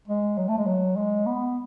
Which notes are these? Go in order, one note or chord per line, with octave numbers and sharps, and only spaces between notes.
G#3
F#3
A3
G#3
F#3
G#3
B3